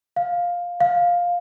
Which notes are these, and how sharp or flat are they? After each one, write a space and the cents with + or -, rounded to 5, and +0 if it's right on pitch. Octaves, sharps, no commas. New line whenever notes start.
F5 +10
F5 +10